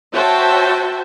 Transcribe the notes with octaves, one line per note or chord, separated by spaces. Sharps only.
F#4 C5 C#5 E5 G5 A5